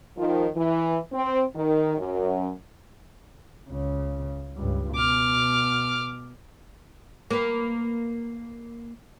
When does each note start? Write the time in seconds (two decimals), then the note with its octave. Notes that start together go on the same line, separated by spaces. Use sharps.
0.17 D#3 F3
0.56 E3
1.12 C4
1.56 D#3
1.98 F#2
3.69 C#2 C#3
4.56 C#2 G2
4.96 B2 D6 F6
7.30 A#3 B4